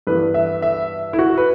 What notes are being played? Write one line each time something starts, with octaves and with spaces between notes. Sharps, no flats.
G2 E3 B3 B4
E5
E5
E4
F#4
B4